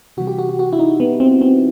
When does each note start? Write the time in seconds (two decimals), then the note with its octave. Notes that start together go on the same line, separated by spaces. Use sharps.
0.17 C3 E3 G3 F#4
0.27 G4
0.39 F#4
0.49 F#4
0.59 F#4
0.73 E4
0.79 D#4
1.00 B3
1.20 C4
1.41 C4